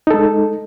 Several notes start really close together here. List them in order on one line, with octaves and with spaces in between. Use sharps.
D#4 A4 G#3